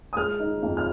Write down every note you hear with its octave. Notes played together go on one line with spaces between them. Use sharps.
D#6
G#3 F6
D#4
F2
F6